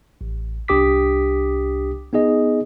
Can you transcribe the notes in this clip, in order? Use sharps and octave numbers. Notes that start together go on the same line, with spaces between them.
A1
C2 D4 G4 D6 D#6 B6
B3 D#4 G#4 D#5